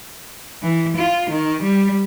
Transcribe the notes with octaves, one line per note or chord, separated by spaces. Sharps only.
E3
F4
D#3
G3